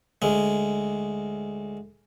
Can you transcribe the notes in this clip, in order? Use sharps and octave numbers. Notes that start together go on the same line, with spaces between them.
D2 G#3